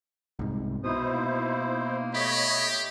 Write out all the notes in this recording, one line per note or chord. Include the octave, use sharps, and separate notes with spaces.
C2 G#2
B2 D#4 E4 C5 D#6
A#3
A3 G4 C#5 D#5 B5